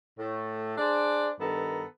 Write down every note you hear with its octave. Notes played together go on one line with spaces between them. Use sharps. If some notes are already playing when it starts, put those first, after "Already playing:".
A2 A3
D4 G#4 C5 D5
G2 D#3 B3 A4 A#5